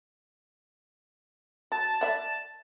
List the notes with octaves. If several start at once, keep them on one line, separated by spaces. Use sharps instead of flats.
F#3 A5
D5 E5 F#5